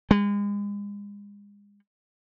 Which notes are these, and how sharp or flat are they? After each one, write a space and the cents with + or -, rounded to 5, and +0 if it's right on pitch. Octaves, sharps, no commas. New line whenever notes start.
G#3 -35